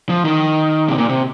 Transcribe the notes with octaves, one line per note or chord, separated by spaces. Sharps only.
F3
D#3
C3
A#2
C3